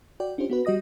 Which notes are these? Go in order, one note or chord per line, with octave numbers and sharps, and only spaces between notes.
F#4 D5 G5
C#4 D4 F4 G4 C5
B3 F#4 B4
G3 F#4 D#5 D#6 A#6